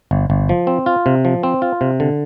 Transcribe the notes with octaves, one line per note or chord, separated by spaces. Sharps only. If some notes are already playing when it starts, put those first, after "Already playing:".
G1
G1
F3
C4
F4
C3
F3
C4
F4
C3
D3